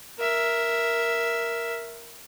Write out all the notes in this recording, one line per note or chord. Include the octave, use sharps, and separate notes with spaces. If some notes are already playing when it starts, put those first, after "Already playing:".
A#4 E5